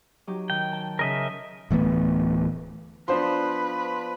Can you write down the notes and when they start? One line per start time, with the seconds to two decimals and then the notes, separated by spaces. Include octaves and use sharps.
0.27 F#3 D#4 G4
0.50 D#3 G5
0.72 A5
0.99 C#3 A#4 D#5 E5
1.71 D1 E3 A3 B3
3.08 F3 B3 D4 B4 C5 C6